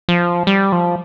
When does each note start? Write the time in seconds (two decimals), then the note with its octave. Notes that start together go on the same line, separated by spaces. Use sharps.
0.09 F3
0.47 G3
0.72 F3